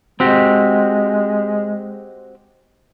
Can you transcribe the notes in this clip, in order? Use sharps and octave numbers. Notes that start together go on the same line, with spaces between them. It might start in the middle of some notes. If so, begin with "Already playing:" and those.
G#3 C4 F#4 G4